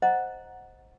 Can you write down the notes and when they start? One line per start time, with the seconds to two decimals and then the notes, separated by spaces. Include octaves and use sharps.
0.02 C5 D#5 F#5 A#5